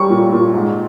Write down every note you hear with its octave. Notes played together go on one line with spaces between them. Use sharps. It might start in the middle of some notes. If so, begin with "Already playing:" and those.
Already playing: G3 C#4 C#6
A#2
A#2
G#2